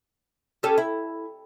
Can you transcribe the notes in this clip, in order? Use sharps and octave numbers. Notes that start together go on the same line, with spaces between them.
C#4 G4 A4
E4